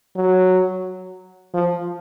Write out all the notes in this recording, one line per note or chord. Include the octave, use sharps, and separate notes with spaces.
F#3
F3